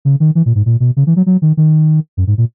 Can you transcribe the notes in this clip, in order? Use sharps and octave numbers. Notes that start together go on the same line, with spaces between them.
C#3
D#3
E3
A#2
G#2
A#2
B2
C#3
E3
F#3
F#3
D#3
D#3
F#2
G#2
A#2